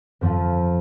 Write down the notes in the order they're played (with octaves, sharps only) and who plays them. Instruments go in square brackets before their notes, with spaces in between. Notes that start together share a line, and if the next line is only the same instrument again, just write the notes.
[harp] F2 F3